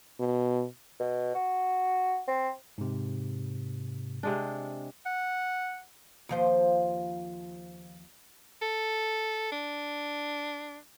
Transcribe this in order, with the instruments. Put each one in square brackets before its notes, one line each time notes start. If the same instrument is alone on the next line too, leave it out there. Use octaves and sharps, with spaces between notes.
[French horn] B2
[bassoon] B2
F#4
C4
[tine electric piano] G#2 C3
[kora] C3 G#3 D4
[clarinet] F#5
[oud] D#2 F3 C5
[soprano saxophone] A4
D4